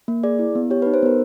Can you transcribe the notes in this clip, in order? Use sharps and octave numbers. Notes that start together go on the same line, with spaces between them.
A#3
G#4 D5
E4
B3
G4 C#5
B4
D#4
C5
B3 A#4